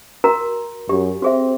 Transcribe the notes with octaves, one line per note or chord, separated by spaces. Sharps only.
F#4 A#4 A#5
F#2 G4
C4 F#4 G#4 E5